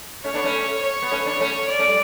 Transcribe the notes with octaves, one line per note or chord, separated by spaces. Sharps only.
A3 C#4 C#5
B3 D4
A3 C#4
C#5
B3
A3 C#4
B3 D4
A3 C#4
D5
A3 C#4
G3